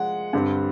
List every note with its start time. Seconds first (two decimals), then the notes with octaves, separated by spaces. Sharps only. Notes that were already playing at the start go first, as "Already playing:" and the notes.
Already playing: F3 G#3 F#5
0.33 G2 D3 G3 C4